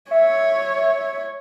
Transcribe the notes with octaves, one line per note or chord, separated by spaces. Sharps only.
C#5 E5